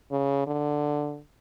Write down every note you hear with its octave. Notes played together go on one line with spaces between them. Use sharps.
C#3
D3